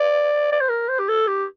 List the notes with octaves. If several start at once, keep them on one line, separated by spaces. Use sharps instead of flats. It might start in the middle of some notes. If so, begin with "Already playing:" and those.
Already playing: D5
D5
C5
A#4
C5
G4
A4
G4